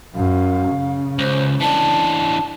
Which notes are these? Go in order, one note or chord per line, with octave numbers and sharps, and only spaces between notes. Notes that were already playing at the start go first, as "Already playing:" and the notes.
F#2 F5
C#3
C#2 C5
E3 D4 A5